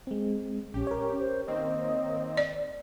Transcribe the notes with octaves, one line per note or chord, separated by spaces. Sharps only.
G#3 C4
A#1 C#4 G4
A#4 C#5
C5
D#3 A#3 C4 D#5
D5